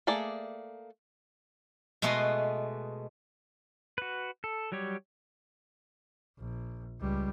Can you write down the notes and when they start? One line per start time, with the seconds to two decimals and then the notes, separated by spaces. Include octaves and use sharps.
0.07 A3 A#3 G#4 D5
2.02 B2 G#3 A3 B4 D#5 C6
3.98 F#4 B4
4.44 A4
4.72 F#3 G3 G4 C#5
6.38 A#1
7.00 C#2 G3